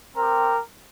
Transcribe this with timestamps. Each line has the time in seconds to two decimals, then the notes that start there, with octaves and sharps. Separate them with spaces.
0.15 C4 G4 A#4